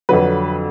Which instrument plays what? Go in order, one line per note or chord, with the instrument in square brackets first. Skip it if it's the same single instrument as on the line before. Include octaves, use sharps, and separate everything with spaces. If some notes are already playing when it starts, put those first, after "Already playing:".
[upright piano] F2 D3 F#3 B4